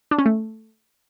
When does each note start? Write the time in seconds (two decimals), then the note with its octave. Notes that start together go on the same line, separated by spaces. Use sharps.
0.11 D4
0.18 C#4
0.26 A3